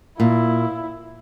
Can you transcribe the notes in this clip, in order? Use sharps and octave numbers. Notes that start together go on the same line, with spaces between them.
A#2 E4